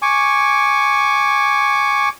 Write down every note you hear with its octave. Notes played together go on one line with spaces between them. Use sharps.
G#5 C#6 D6